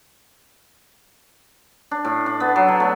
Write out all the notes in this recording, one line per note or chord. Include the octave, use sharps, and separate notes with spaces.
D4
A2
D4
B3
F#3
D3
A3